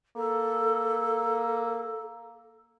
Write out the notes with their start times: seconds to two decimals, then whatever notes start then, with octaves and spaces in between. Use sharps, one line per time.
0.17 A#3 A4